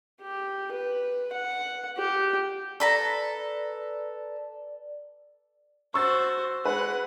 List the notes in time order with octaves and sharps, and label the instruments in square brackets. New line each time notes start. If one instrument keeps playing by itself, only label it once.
[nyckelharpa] G4
B4
F#5
G4
[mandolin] A4 B4 A#5 [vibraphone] D5
[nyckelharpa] F#4 C5 [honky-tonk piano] C#6 E6 A6
[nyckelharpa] G#3 F#5 [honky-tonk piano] B4